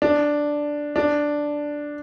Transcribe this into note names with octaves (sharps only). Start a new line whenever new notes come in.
D4
D4